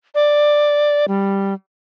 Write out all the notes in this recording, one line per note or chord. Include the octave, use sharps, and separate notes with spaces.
D5
G3